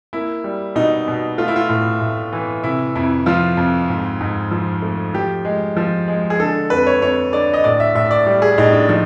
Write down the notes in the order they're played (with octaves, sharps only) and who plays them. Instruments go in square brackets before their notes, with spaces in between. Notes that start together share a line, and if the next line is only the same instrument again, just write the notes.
[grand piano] A#3 E4
G3
B2 D#4
B2
A3 F4
E4
F4
A2
A2
E3
C3 E4
F2 E4
F3 F4
F2
G#2
G#2
F3
A3
F3 G4
G#3
F3
G#3
G#4
D3 A4
F2 B4
C#5
F2 C#5
D3 D5
D#5
A2 D5
E5
A2 E5
D5
G3
G#4
A2 D#4
D4
F3 D#4